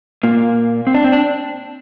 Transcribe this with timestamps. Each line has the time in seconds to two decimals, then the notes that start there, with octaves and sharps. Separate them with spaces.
0.23 A#2 A#3
0.87 C4
0.95 D4
1.04 C4
1.12 D4